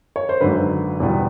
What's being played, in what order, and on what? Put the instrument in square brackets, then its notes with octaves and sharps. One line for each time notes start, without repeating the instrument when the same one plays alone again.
[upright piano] C#5
C5
G#1 F#2 D3 B4
E2 B2 G3 B3